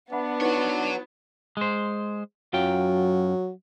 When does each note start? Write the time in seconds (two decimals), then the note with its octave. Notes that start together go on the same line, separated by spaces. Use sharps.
0.12 B3 D4 E5 F#5 B5
0.41 D#4 E4 F#4 B4 C#5
1.57 G#3 C5
2.53 F#2 F#3 F4 G5